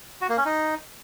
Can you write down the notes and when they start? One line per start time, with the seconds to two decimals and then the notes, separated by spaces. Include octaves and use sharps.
0.21 F#4
0.29 A#3
0.37 C#4
0.45 D#4